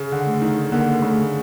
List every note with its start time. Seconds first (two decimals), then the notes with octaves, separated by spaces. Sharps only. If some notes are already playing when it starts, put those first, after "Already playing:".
Already playing: C#3
0.12 D3
0.27 A3
0.42 D#3
0.72 D3 A#3
1.01 C#3 A3